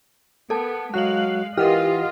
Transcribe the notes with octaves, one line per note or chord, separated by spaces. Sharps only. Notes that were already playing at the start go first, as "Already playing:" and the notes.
B3 A4 A#4 A5
F#3 G#3 F#4 F5 F#6 F#7
E3 F4 G4 A#4 D#5 F#5 F6